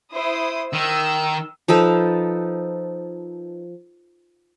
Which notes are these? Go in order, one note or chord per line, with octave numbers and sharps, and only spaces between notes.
E4 C5 D#6
D#3 E6
F3 D#4 A4 B4